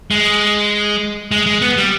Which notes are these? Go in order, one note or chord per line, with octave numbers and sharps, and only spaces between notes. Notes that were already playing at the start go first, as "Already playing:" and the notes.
G#3
G#3
G#3
B3
G3